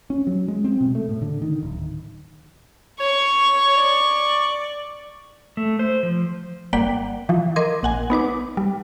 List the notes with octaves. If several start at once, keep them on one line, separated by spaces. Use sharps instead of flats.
C#4
F#3
G#3
C4
B2
A3
A2
D3
D#3
D1
C#5 C#6
D5
A3
C5
F3
G1 A#3 D5 F#5 G5 B6
E3 F3
A#4 D#5 C6 D6 G#6
A#1 F#5 G#5
B3 D#4 B4 D6
G3